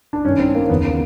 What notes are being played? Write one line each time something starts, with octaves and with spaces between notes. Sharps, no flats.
D4
G2 D#3 C#4
C4
A#3
D#2 C#3 E3 B3
A#3